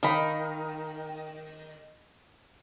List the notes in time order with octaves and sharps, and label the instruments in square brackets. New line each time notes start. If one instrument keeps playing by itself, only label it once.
[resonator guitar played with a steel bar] D#3 [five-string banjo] F5 B5